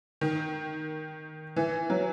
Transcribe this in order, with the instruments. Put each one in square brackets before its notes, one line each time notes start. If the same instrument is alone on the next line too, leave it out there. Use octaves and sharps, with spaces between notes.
[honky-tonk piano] D#3
E3
F#3